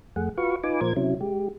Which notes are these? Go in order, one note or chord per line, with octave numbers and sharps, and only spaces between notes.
F2 A3 G#4 F#5
F4 F#4 B4 F5 C#6
D#4 F4 B4 G#5 D6
A#2 F3 A#4 C5 G#6
C3 F#3 C#4 E4
G#3 G4